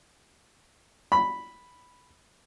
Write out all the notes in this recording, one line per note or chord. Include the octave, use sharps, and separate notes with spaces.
B5